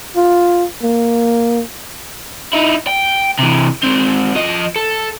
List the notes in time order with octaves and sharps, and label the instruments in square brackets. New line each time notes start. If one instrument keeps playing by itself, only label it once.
[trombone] F4
A#3
[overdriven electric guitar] D#4 E4
G5
C3 E3
G#3 C4
F3 D#5
A4